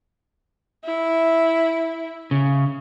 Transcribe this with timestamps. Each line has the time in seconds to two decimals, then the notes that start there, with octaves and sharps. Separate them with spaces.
0.85 E4
2.31 C#3